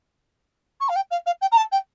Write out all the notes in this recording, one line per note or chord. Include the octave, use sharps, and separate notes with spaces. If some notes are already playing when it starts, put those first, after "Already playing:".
C#6
F5
G5
F5
F5
G5
A#5
A5
G5